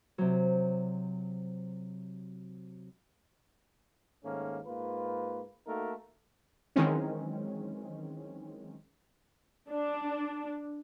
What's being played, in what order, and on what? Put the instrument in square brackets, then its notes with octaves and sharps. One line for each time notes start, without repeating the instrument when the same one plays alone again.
[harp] C3 F#3
[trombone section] G#2 D#3 A3 A#3 C#4
G#2 A#3 F4 B4
A3 A#3 D#4 F#4 A4 A#4
[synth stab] D#3 E3 F#3 G#3 C4 C#4
[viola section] D4